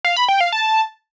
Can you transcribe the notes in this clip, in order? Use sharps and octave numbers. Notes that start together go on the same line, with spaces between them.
F5
B5
G5
F5
A5